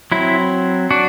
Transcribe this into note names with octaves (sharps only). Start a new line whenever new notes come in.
F#3 C4 E4
D4 F#4